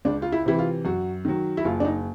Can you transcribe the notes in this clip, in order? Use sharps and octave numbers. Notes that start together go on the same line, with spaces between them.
C#2 D4
F4
E4
C3 E3 E4
F4
F#2 F#4
D#3 F#3
E4
F#1 F4
D4
D#4